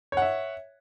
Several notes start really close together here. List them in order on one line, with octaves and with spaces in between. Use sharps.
C#5 F#5 E5